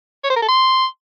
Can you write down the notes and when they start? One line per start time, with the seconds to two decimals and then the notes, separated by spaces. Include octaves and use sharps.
0.24 C#5
0.30 C5
0.36 A#4
0.42 A4
0.48 C6